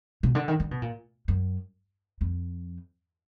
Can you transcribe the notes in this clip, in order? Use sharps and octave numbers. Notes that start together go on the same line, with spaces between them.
B2
D3
D#3
D3
B2
A#2
F#2
F2